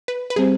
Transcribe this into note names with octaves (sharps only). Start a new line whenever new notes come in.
B4
B4
G3 C4 G4 G#4 C5